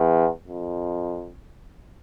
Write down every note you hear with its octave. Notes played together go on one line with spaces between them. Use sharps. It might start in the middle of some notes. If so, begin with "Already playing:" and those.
Already playing: E2
F2